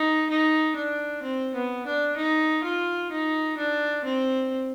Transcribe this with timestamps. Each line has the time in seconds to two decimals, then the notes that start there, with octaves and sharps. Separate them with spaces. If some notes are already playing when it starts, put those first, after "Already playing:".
Already playing: D#4
0.30 D#4
0.76 D4
1.22 C4
1.54 B3
1.86 D4
2.17 D#4
2.63 F4
3.11 D#4
3.57 D4
4.04 C4